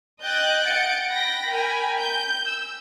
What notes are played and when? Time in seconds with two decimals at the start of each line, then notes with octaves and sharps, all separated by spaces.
0.22 D#5 G5 F#6 G6 A6
0.63 F#5 G6 A6 C#7 D7
1.11 G5 B5 A#6
1.50 A#4 G5 G#5 B5
1.99 G6
2.47 E6